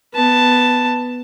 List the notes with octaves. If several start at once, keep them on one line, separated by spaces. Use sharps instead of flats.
B3 A5